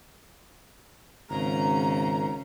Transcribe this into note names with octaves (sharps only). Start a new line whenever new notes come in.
G#1 C#3 A#5